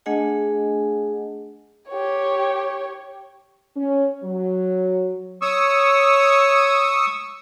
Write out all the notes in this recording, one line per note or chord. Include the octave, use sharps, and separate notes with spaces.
A3 D4 G#4 D#5 F#5 G#5
G4 C#5
C#4
F#3
C#5 C#6 D#6 E6